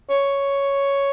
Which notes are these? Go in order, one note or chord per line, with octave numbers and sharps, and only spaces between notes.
C#5